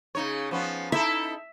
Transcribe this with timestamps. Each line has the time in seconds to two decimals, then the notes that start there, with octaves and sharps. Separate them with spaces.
0.15 C#3 D#4 C#5
0.51 F3 B3 C#4
0.92 D#4 E4 A4 E5